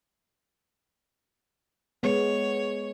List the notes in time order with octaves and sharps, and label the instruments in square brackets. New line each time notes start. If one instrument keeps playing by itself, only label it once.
[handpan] G#3 B3 [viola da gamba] C#5